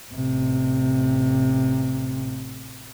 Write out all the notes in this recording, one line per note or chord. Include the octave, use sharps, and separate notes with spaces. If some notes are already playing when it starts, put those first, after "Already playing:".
A1 C3